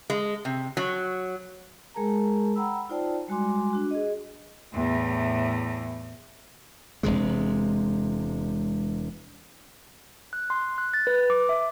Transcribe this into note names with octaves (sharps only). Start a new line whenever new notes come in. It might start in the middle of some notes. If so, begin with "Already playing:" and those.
G#3
C3
F#3
G#3 G#4 A#4 A5 A#5
F#5 G5 A#5 B5 E6
D#4 F4 C5 D5 G5 A5
G3 G#3 F#4 G#5 C6 D6
D4 F#4
G#4 D#5
E2 A2
E1 D#2 C3 G#3
F#6
C6
F#6
A6
B4
D6
E5